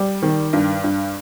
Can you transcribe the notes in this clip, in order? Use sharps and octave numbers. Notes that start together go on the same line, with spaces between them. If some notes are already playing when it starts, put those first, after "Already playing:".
Already playing: G3
D#3
G2
G2